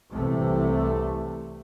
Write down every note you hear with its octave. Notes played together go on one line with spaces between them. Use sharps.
C2 C3 E3 A3